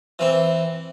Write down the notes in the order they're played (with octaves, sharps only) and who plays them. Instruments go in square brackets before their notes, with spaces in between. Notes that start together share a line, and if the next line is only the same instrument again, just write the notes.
[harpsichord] E3 C4